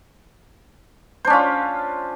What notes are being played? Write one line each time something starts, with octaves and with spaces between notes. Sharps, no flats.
C#4 D4 F4 C5